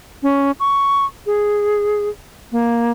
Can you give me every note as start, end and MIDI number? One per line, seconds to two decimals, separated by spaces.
0.23 0.51 61
0.60 1.05 85
1.26 2.09 68
2.52 2.91 58